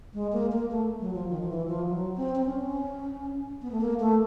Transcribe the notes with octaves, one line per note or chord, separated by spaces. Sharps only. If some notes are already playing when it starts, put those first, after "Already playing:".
G#3
A#3
A#3
A3
F#3
F3
D#3
F3
E3
F3
F#3
C4
C4
C#4
B3
A3
A#3
A3